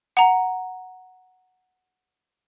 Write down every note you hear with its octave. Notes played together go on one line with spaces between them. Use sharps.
F#5 A#5